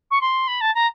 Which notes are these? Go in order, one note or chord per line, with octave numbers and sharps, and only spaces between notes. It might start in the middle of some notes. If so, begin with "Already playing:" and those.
C#6
C6
B5
A5
A#5